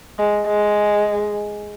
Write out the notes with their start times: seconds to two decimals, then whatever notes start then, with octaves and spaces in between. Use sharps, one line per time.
0.19 G#3
0.47 G#3